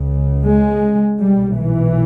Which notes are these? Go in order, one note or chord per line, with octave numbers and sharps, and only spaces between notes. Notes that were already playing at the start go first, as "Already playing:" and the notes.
Already playing: C#2 C#3
G#3
B1 A#2 G3
E3